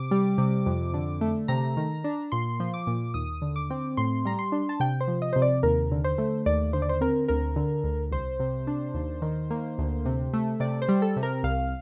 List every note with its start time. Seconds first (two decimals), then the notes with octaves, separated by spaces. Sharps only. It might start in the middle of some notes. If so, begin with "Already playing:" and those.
Already playing: C3 D6
0.11 G3
0.38 C3
0.66 F2
0.94 D3
1.21 A3
1.48 C3 A#5
1.77 D#3
2.04 D4
2.32 A#2 C6
2.60 F3
2.74 D6
2.87 A#2
3.14 D#2 D#6
3.42 D3
3.56 D6
3.70 C4
3.97 A2 C6
4.25 G3 A#5
4.39 C6
4.52 D4
4.69 A5
4.80 C3 G5
5.01 C5
5.07 F3
5.22 D#5
5.33 C3 C5
5.42 D5
5.63 D#2 A#4
5.91 D3
6.04 C5
6.18 A3
6.46 D#2 D5
6.73 D3 C5
6.82 D5
6.89 C5
7.01 C4 A#4
7.28 D2 A#4
7.56 D3
7.84 D2
8.11 C2 C5
8.40 C3
8.67 D4
8.94 D#2
9.22 D#3
9.51 A#3
9.78 D2
10.05 C3
10.34 A3
10.60 C3 D5
10.82 C5
10.89 G3
11.02 A4
11.16 C3
11.23 A#4
11.43 C2 F5